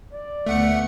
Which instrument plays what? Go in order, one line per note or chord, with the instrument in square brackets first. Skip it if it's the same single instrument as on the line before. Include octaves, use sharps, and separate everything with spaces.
[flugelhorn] D5
[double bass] D2 B3 [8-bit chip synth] A3 F#5 C#7